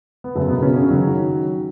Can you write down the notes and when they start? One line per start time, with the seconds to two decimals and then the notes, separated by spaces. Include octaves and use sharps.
0.24 B3
0.35 F#2 C#3 F#3 A3
0.49 B2 B3
0.62 C#3 C#4
0.76 C#3 C#4
0.90 D#3 F#3